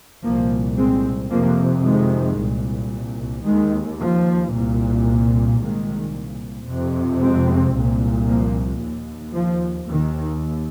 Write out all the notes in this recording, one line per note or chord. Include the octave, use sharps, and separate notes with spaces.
C2 A#2 F3 A#3
G#3 C4
F2 C3 F3 A#3
D#3 G#3
C2 A#2
D#2 D#3 G#3
F3
C2 A#2
C2 A#2 D#3 G#3
F2 C3
G#3 C4
C2 A#2
F3 A#3
D#2
F3
D#2 D#3